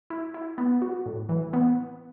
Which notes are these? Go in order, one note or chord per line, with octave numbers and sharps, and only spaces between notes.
E4
E4
B3
F#4
A2
E3
B3